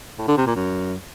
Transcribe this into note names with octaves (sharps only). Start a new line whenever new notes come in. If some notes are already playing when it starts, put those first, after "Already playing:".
A2
D3
C3
A#2
F#2